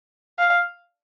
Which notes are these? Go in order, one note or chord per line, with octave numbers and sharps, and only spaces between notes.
F5